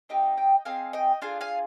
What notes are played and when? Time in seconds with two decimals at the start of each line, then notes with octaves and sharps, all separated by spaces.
0.09 C4 D#4 G4 D#5 G5
0.37 D#5 G5
0.65 C4 D#4 G#4 F5 G#5
0.93 D#5 G5
1.22 D4 F4 G#4 F5 G#5
1.41 F5 G#5